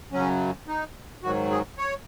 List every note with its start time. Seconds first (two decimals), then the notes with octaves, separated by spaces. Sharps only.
0.12 F#2 C#3 F#3 C#4
0.68 D#4
1.23 G#2 D#3 F#3 F#4
1.51 G#4
1.78 C#5